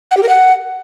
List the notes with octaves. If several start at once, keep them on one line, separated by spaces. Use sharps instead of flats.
F#5
G4
A#4
F#5